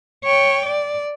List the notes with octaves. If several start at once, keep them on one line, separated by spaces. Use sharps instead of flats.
C#5 G5
D5